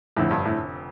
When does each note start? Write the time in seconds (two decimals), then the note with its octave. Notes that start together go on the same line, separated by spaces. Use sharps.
0.16 F1 F2 A2 D3
0.31 G2
0.45 A2